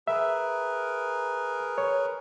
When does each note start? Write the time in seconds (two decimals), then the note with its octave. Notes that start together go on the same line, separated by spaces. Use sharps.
0.08 G#4 A#4 B4 E5
1.78 C#5